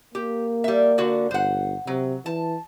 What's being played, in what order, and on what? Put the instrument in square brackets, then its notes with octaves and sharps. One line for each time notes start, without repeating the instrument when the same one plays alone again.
[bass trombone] A#3 [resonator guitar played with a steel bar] G4
[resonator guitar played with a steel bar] G3 E5
D3 F#4
[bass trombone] G1 [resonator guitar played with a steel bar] C5 F#5
[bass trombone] C3 [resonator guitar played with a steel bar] F#3
[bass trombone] E3 [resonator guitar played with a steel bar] A5